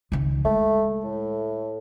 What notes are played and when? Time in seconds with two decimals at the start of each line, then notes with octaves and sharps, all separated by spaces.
0.12 C#2 D#3
0.45 G#3 A3
1.04 A2